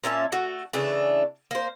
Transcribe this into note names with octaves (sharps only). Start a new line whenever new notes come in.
A#2 C#4 E5 A5
A3 F#4
C#3 E3 A3 D4
A#3 C5